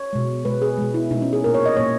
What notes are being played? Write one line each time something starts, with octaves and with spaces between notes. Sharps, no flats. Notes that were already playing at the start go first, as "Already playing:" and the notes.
Already playing: C#5
B2 G#3
B2 G#3 B4
G#4
B2 G#3
E4
B2 G#3 D#4
C#4
G#4
A#2 A#3 A#4
C#5
D#5
A#2 A#3 C#5